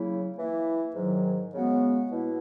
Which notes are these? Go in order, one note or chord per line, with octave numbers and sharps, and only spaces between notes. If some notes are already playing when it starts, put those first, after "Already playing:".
Already playing: C#3 F#3 A#3 E4
E3 A#3 E4
G#2 D#3 F#3
C#3 G#3 B3 F#4
B2 A#3 E4